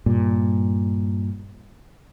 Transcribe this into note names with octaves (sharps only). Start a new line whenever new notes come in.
G2 A#2